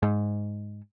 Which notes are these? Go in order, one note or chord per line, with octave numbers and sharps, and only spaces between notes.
G#2